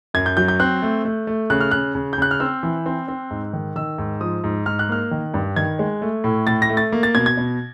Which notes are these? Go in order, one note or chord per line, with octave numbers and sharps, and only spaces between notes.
F#2 G#6
G6
F#3 G6
G6
C4 F#6
A3
A3
A3
C#3 F#6
F6
C#3 F#6
C#3
G6
C#3 F#6
F6
C4 E6
E3
C4
C4
G#2
D#3
D#3 E6
G#2
F3 D#6
G#2
G#2 F6
F#6
A#3 F6
D#3
G2
D#3 G#6
G#3
A3
A2
A2 A6
A#6
A3
A6
A#3
A6
B2 G#6
G#6
B2